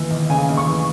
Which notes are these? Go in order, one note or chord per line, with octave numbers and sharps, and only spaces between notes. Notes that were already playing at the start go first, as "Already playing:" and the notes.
Already playing: D#2 E3
D#2
C#3 G#5
D#2
C#6
E3